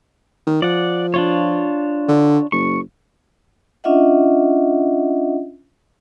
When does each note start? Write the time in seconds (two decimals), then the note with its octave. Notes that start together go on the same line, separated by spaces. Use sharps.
0.47 D#3
0.62 F3 D5 F#5
1.14 D4 F4 C#5
2.08 D3
2.52 F#1 C#6
3.84 C#4 D4 F4 D#5 E5 F#5